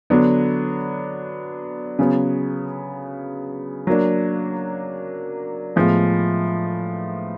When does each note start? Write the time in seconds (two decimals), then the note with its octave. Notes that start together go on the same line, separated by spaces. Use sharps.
0.10 D3 F#3 B3 D4
1.99 C#3 F#3 B3
3.87 F#3 A#3 D4
5.76 A2 F3 G#3 B3